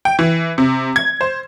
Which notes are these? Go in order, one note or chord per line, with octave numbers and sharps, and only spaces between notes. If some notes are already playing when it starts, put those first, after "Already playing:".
G5
E3
C3
G#6
C5